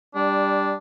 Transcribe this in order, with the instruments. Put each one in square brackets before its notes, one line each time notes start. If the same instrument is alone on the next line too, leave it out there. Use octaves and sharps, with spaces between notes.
[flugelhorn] G3 [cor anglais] D4